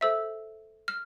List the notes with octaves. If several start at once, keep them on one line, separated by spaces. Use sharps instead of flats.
A4 C5 E5 E6
F6